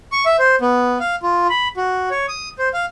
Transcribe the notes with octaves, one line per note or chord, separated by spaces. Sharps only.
C#6
E5
C5
B3
F5
F4
B5
F#4
C#5
D#6
C5
F5